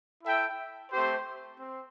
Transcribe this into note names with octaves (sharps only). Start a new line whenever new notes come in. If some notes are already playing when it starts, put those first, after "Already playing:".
E4 A4 E5 G5
A3 C4 G4 C5
C4